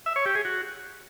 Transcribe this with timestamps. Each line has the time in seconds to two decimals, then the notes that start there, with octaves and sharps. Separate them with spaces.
0.06 E5
0.16 C#5
0.26 G4
0.35 G#4
0.45 F#4